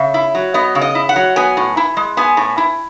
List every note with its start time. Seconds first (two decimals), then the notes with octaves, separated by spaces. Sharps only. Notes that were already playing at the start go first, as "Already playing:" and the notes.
Already playing: C#3 E5
0.14 E4
0.35 F#3
0.54 B3 D#5
0.75 C#3
0.81 D#5
0.95 E4
1.09 F#5
1.16 F#3
1.36 B3 G#5
1.57 A2
1.77 E4
1.97 G#3
2.17 B3 G#5
2.37 A2
2.58 E4